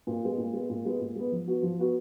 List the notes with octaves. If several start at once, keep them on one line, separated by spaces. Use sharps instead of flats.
A#2
G#3 B3
A#2
G#3 B3
A#2
G#3 B3
A#2
G#3 B3
F3
B3 F#4
F3
B3 F#4